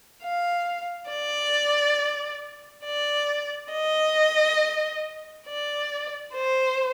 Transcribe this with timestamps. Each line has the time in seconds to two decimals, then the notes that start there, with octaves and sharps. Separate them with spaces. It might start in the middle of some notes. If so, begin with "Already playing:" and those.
0.23 F5
1.10 D5
2.84 D5
3.73 D#5
5.48 D5
6.35 C5